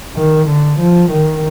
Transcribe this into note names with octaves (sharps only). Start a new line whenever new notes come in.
D#3
D3
F3
D#3